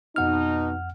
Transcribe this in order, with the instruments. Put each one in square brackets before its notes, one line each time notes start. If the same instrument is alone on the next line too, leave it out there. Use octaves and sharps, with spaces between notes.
[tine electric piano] F2 F#5 F6 [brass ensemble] B2 D#4